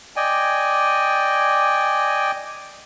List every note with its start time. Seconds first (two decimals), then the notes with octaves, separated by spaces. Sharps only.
0.16 D5 D#5 G5 G#5